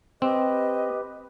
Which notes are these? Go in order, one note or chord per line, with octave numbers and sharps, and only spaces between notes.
C4 G4 B4 D#5